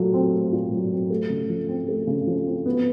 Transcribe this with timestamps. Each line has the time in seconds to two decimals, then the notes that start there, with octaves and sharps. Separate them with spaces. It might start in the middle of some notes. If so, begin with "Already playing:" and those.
Already playing: A#2 F#3 A3
0.14 C4
0.33 A3
0.52 A#2
0.72 F#3
0.91 C4
1.10 A3
1.30 C#3
1.49 F3
1.69 C4
1.88 A3
2.07 C#3
2.27 F3
2.46 C4
2.66 B3